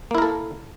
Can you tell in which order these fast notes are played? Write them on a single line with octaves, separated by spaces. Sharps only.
A#3 E4 A#4 A4